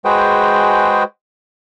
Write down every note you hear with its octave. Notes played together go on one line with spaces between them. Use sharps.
G#3 F#4 G#4 B4 C5 G5